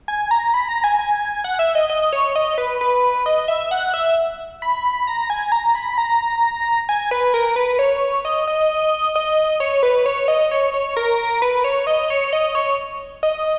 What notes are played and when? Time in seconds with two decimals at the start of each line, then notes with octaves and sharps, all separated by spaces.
0.08 G#5
0.31 A#5
0.54 B5
0.69 A#5
0.84 G#5
0.99 G#5
1.44 F#5
1.59 E5
1.75 D#5
1.90 D#5
2.13 C#5
2.36 D#5
2.58 B4
2.81 B4
3.26 D#5
3.48 E5
3.71 F#5
3.94 E5
4.62 B5
5.07 A#5
5.30 G#5
5.52 A#5
5.75 B5
5.98 A#5
6.89 G#5
7.11 B4
7.34 A#4
7.56 B4
7.79 C#5
8.25 D#5
8.47 D#5
9.16 D#5
9.60 C#5
9.83 B4
10.06 C#5
10.28 D#5
10.51 C#5
10.74 C#5
10.97 A#4
11.42 B4
11.64 C#5
11.87 D#5
12.10 C#5
12.33 D#5
12.55 C#5
13.23 D#5